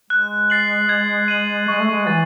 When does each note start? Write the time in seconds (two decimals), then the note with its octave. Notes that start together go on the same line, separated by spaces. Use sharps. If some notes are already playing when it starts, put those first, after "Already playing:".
0.10 G#3 F#6
0.50 A6 C7 F#7
0.89 G#6
1.28 D#7 F#7
1.68 G#3 C#6
1.79 A3
1.91 G#3
2.07 E3 A6